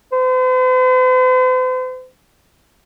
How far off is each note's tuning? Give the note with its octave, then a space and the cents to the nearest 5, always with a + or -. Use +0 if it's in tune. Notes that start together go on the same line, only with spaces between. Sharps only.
C5 -45